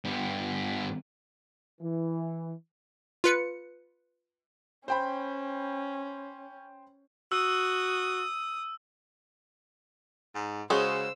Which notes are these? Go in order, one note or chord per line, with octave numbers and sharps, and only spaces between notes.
G2 B3
E3
F4 B4 C#7
C#4 C5 G5 B5
F#4 D#6 E6
G#2
C#3 G#3 C#4 F#4 G#4 C5 E6